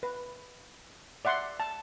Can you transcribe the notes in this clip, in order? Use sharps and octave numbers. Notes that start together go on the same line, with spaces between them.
B4
D5 E5 F#5 C6
A5